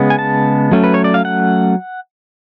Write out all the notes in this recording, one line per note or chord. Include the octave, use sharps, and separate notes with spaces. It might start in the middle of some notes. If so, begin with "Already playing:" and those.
Already playing: C#3 G#3 B3
G#5
A5
F#3 A3 C#4
B4
C#5
D5
F5
F#5